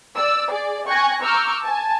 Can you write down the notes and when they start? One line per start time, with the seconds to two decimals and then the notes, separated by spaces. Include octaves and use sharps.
0.16 D5 E6
0.51 G#4 D5
0.88 G5 G#5 C#6 F#6 G#6 A#6
1.22 A#5 C#6 D6 E6 F6 G6
1.63 G#5 A5